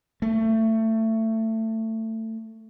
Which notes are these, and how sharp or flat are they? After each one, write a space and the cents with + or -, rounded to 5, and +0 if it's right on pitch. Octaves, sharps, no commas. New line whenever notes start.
A3 +20